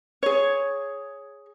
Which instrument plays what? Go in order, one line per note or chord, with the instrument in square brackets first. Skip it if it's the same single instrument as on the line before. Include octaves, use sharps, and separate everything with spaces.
[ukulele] G#4 C#5